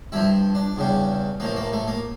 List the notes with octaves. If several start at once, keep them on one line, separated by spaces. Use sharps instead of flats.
G2 F3 E4
D4
E2 C#3 G3
A1 A2 F3 A#3
A#3
A3
A#3